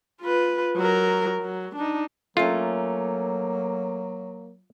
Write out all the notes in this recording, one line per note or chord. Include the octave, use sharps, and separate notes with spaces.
F4 B4
F#3 A#4
F#3
D4 D#4
F#3 A3 A#3 C#4 F4